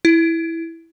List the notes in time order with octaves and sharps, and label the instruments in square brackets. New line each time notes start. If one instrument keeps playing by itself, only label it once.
[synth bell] E4